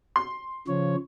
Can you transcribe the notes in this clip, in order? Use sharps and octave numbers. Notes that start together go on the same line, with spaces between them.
C6
C#3 F3 C#5